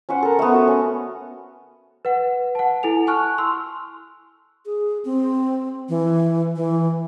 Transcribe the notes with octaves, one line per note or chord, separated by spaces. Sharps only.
C#4 B4 C5 F#5
A4 A#4
A3 B3
F#4
C#4
B4 F#5
F#5 A5
E4 A4 G#5 F7
G#5 A5 C#6 F6 F#6
C6 E6
G#4
C4
E3
E3